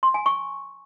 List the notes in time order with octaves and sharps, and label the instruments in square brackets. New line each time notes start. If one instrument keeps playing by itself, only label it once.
[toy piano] C6
G#5
C#6